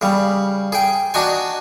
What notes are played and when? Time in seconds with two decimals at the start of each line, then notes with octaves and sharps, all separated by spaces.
0.01 C#3 G3
0.72 G#4 G5
1.14 D4 D#4 F#4 G#5